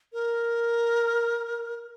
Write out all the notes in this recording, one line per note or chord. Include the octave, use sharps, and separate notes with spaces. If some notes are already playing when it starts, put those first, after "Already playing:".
A#4